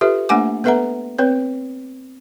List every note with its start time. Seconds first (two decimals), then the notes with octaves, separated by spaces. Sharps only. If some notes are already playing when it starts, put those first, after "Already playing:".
0.01 F4 G4 A4 B4 E5
0.29 A3 A#3 D4 F#5 G#5 D6
0.64 B3 A4 B4 E5 F#5 A#5
1.18 C4 B4 C#5